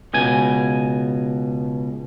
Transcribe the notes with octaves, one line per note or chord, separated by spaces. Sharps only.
C#2 B2 G#5